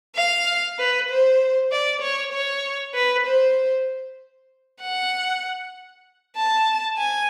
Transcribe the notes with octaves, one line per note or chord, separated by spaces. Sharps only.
F5
B4
C5
D5
C#5
C#5
B4
C5
F#5
A5
G#5